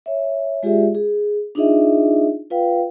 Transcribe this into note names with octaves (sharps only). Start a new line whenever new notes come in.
C#5 E5
G#3 F4 G4 G#4 D5 E5
G#4
D4 D#4 F4 G#4 D#5 E5
F4 B4 F5 G5